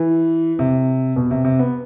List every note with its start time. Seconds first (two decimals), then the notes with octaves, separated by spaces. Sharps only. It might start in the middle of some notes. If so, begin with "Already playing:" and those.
Already playing: E3
0.59 C3
1.16 B2
1.31 C3
1.45 C3
1.59 B3